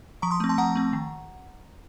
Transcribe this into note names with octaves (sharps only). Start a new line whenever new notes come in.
F3 A#5 C#6
C6 D#6
A3 C4
A5 C6
F3 F#5 A#5
A3 C4
D#3